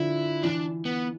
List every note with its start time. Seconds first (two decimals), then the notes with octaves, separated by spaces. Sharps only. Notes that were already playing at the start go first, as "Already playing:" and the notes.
Already playing: D3 F3 E4
0.43 E3 D4
0.85 B3